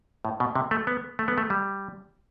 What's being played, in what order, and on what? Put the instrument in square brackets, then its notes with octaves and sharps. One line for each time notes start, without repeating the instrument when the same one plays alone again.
[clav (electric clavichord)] A2
B2
C3
A3
B3
A3
B3
A3
G3